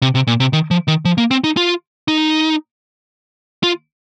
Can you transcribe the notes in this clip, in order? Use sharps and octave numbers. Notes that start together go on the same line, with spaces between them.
C3
C3
A#2
C3
D#3
F3
D#3
F3
A#3
C4
D#4
F4
D#4
F4